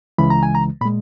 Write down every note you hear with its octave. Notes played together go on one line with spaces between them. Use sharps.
C#2 C#3 E3 G#3 B5
A#5
G#5
A#5
A#2 G#3 B5